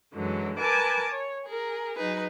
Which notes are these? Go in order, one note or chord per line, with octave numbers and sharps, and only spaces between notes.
F#2 D3 E3 F#3 G#3
A#4 B4 G#5 A5 D6
C#5
G#4 A#4
F#3 D#4 G#4 B4